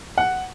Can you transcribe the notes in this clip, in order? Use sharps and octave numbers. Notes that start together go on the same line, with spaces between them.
F#5